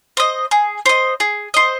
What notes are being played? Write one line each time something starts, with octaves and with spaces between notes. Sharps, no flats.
C5 D#5
G#4
C5 D#5
G#4
C5 D#5